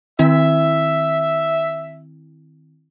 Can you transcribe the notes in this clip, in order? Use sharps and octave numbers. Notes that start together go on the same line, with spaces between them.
D#3 C4 E4 E5